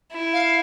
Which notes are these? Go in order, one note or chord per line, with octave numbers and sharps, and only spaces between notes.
E4
F5